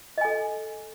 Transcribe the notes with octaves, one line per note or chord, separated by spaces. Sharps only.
A4 D#5 G#5